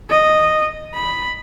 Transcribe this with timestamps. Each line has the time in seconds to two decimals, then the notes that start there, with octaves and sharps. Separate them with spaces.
0.10 D#5
0.95 B5